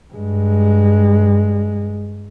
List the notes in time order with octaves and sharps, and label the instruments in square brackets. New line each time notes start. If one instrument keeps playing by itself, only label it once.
[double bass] G2 G#3